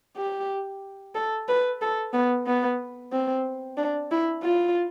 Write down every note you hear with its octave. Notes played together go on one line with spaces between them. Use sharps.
G4
A4
B4
A4
B3
B3
C4
D4
E4
F4